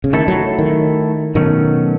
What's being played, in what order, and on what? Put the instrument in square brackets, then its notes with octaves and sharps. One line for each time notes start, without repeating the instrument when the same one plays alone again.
[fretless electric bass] C#3
[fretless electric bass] D#3 [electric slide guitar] A3 E4 A4
[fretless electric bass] F#3
D#3
[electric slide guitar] B2 F#3 A3 C#4 [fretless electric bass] D#3